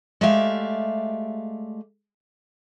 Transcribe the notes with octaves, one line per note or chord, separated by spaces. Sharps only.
G#3 A3 G4 D5 E5 F5